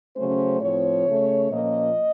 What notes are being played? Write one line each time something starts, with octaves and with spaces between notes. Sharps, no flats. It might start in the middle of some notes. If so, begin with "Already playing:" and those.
C#3 F#3 A3 C#4 C5
A2 F3 C4 C#5
C#3 A3 C#4
A#2 F3 A#3 C#4 D#5